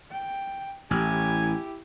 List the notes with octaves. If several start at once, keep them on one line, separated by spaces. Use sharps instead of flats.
G5
A1 E4 G4 G#5